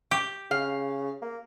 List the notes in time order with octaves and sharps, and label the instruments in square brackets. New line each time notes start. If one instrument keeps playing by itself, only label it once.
[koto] G4
[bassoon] C#3 [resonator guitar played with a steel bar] F5
[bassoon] A#3